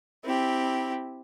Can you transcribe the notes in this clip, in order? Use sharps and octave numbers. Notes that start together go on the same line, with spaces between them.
C4 E4 G4